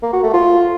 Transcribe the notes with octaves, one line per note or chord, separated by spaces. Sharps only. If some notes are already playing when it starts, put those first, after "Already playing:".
A#3
F#4
A3
F4